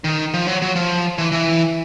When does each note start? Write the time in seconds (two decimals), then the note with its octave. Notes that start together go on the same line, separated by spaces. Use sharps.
0.04 D#3
0.34 F3
0.47 F#3
0.62 F#3
0.76 F3
1.18 E3
1.32 E3